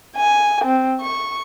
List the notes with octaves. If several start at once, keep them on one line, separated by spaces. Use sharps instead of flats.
G#5
C4
C#6